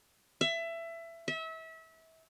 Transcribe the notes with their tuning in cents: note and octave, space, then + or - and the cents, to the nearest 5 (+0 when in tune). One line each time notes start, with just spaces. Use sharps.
E5 +20
E5 -30